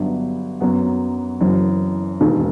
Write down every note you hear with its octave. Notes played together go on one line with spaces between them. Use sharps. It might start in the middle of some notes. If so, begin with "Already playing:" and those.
Already playing: G1 G2 F#3 B3
F#2 F#3 B3
F#1 F#2 E3
E1 D#2 D#3